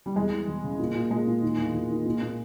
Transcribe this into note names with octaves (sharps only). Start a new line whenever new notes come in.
G3
E2 G#3
E3
E2
C#3
A#2
A#2
A#2 G#3
A#2
D#3
E2
E2
D#3
A#2
A#2